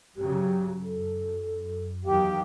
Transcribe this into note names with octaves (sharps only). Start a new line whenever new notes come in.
G2 C#3 F#3 G4
F#2 A4
E2 D#3 F#3 G4 F5